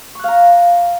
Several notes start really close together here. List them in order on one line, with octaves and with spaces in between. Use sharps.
C#6 F#6 F5 A#5